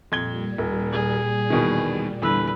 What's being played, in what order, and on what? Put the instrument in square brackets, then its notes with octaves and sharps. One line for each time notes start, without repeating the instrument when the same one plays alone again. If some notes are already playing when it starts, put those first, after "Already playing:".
[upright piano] F2 G#6 G7 [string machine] A#2 G3
[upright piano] D#1
[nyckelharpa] G#4
[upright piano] E2 B2 D#3
[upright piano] E2 D3 E6 [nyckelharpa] B4